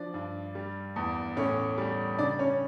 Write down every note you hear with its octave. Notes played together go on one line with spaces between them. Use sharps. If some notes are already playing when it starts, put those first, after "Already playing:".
Already playing: F3 D4 D5
G2
G3
E2
A2 C#4 C#5
G3
C#3 D4 D5
C#4 C#5